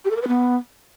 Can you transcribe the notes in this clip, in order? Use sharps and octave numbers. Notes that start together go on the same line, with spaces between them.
G4
A4
A#4
B4
B3